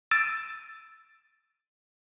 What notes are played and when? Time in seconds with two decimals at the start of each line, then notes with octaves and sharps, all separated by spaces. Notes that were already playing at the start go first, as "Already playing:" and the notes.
0.11 E6 A6 D7 D#7